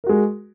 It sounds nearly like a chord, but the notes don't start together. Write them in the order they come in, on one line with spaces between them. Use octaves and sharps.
A#4 F#4 G#3